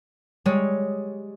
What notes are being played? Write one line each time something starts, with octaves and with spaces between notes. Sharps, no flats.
G3 G#3 C#5